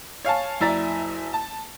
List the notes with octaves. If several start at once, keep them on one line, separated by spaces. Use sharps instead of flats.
C#5 F5 G#5 A5
F#1 E4 D5 E5 A#5 A6
A5